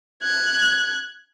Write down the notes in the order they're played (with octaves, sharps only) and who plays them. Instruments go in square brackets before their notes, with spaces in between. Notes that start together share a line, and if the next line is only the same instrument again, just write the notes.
[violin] F#6 G#6